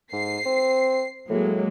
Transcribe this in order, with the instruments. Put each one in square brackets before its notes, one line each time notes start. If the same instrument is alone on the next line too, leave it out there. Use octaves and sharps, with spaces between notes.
[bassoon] G#2 [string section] C7
[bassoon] C4
[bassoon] A2 [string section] F#3 G#3 A#3